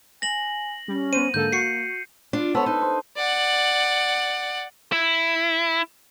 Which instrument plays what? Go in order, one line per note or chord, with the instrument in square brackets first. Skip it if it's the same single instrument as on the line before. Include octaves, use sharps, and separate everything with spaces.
[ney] G#5 [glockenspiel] A#6 F#7
[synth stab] G3 [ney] C#4
[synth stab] B3 C5 [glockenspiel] D#7
[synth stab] G#2 D3 A4 [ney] A#3 [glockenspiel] G6
[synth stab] F#4 [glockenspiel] C7 C#7
[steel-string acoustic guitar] D4 F4
[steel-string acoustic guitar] B3 C#5 [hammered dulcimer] A4 C5
[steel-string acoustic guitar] D#4 [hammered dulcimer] B4
[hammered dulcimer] C5
[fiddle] D5 F#5
[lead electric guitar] E4